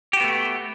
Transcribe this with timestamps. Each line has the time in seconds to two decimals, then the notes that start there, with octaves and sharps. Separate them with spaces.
0.13 G4
0.17 F#4
0.20 B3
0.24 A3